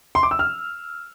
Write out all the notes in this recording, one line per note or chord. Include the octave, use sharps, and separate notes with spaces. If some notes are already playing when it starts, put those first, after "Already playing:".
C6
D6
E6
F6